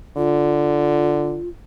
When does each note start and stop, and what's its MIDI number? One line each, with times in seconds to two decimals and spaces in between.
0.17 1.40 50
0.17 1.48 65